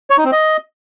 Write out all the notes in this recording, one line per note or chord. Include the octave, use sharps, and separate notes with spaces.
C#5
D#4
C4
D#5